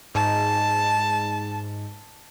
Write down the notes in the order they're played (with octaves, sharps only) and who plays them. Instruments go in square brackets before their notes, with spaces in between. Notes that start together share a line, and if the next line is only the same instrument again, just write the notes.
[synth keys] G#2 [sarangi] A5